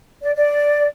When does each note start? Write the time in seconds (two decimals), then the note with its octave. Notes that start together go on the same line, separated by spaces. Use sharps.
0.22 D5
0.36 D5